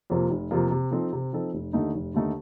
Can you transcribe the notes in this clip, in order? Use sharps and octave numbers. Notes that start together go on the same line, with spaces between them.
F2 C3 F3 A#3
F1
F2 C3 F3 A#3
C3
F3 C4 D#4 A4
C3
F3 C4 D#4 A4
F1
D#2 D3 A3 D#4
F1
D#2 D3 A3 D#4